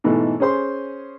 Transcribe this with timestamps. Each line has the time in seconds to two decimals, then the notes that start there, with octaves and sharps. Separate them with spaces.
0.04 G#2 B2 E3 A3
0.40 C#4 G#4 C5 C6